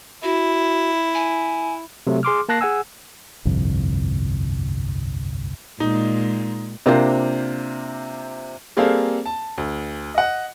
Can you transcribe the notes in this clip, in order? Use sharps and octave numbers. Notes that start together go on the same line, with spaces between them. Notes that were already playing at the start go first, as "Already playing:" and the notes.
E4 F#4
G#5
C3 F#3 A3
G#4 C6 D6 F6
A#3 A5 F#6 A#6 C7
G#4 F#5 G#5 E6
G1 C2 F2
A#2 G#3 D#4
C3 A#3 C4 D4 F4 C5
G3 A#3 C4 G#4 A4 F5
A5
D2
D#5 F#5